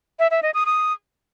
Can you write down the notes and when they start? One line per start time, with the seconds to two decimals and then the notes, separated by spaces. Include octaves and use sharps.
0.19 E5
0.31 E5
0.42 D#5
0.54 D#6
0.66 D#6